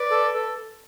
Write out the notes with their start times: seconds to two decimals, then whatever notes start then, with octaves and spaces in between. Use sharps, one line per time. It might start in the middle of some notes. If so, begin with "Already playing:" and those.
Already playing: B4 D5
0.11 A4
0.34 A4